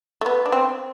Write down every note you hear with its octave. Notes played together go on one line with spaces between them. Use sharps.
A3
B3
D4
C4